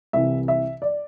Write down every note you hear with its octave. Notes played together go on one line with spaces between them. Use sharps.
C2 C3 E3 E5
E5
D5